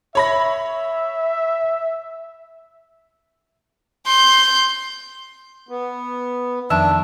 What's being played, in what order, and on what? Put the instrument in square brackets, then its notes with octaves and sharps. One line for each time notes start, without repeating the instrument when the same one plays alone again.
[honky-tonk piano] C#5 B5 A#6 [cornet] E5
[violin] C6 G6
[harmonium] B3
[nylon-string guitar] F2 D#3 [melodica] D4 [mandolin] E5 A5